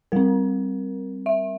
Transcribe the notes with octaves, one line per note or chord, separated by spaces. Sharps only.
G3 C4 A#4
E5